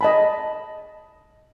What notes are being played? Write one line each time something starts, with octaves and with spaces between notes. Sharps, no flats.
D#5 A5 B5